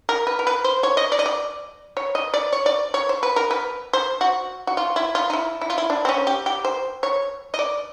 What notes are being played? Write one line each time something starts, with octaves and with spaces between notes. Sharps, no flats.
A#4
B4
A#4
B4
C5
C#5
D#5
D5
D#5
D5
C#5
D#5
D5
C#5
D5
C#5
C5
B4
A#4
B4
C5
F#4
F#4
F4
E4
F4
D#4
E4
E4
F4
E4
D4
C4
C#4
G4
G4
C5
C#5
D#5
D5